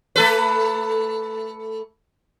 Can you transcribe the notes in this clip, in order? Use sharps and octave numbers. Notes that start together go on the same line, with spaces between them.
A3 A4 B4